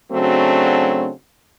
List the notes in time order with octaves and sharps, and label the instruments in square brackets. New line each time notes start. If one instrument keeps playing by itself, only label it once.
[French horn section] C#3 F#3 A3 C4 D4 F#4